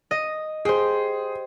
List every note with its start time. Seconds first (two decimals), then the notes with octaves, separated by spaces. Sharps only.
0.11 D#5
0.65 G4 G#4 C5